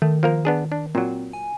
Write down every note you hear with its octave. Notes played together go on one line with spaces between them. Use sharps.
D#3 A3
F3 A#3 A#4
B3 D4 G#4
D4
A#2 F#3 C4
G#5